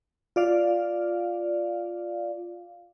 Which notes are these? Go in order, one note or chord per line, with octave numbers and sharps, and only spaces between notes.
F4 D5 F5